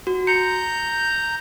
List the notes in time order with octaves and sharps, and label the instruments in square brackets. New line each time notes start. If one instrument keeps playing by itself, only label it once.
[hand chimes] F#4
[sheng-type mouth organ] A#5 G6 [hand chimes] C#7